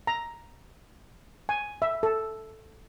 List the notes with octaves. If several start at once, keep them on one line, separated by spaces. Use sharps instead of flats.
A#5
G#5
E5
A4